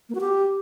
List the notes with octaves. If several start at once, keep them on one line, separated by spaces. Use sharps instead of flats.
A#3
F#4
G4